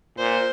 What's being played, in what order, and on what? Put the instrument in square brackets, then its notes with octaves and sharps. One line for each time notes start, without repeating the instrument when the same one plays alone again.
[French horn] A#2 [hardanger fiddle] C5